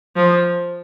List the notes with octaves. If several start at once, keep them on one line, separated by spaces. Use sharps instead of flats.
F3